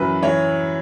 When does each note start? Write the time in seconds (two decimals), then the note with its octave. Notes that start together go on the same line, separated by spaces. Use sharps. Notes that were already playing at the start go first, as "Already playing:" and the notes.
Already playing: F#2 E3 B4
0.22 E3 C#5